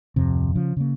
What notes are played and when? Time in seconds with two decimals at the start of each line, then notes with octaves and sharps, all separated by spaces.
0.16 D1 F2 C3
0.55 C#3 F3
0.77 C#3 A#3